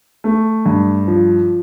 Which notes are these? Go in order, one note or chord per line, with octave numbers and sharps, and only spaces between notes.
A3
G2
F3